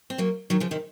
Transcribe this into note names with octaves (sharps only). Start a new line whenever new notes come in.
C4
F#3 A#3
D#3 F#3
C#3 F3
C3 D#3